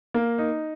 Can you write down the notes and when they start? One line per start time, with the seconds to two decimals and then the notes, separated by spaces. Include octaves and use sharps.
0.14 A#3
0.38 D#4